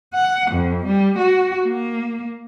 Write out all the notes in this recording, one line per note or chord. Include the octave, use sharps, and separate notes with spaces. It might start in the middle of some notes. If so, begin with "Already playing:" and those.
F#5
F2
G3
F#4
A#3